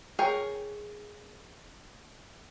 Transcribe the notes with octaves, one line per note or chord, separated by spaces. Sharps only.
G#4 A#4 C#5 G5